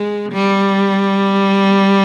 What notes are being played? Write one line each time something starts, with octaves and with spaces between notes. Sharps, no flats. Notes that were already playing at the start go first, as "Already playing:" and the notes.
Already playing: G#3
G3